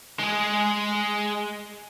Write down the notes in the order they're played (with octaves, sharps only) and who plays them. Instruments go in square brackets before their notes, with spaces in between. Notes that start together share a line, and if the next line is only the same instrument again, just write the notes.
[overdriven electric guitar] G#3 G#4